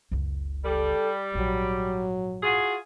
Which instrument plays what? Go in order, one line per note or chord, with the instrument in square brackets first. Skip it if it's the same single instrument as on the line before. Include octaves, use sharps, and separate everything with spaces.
[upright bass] F#1 C#2
[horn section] G3 [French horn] A4
[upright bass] A#1 G#2 [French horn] F#3
[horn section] F4 F#4 G#4